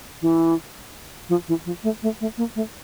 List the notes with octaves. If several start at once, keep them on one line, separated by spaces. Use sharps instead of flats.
E3
F3
E3
F3
A3
A3
A3
A#3
A3